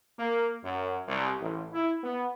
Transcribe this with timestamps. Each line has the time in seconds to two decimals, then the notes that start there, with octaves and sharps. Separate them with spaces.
0.18 A#3
0.63 F#2
1.08 C2
1.41 A1
1.73 E4
2.04 B3